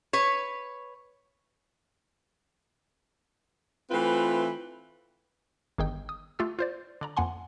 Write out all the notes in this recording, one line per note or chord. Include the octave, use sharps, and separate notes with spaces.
B4 C#5
E3 A3 C4 F4 B4
G1 D#3 G#4 D#5 G5
D#6
A3 F4 G4 E6
F4 C5 D5
D3 D5 A#5
F2 A#3 F#5 G#5 C6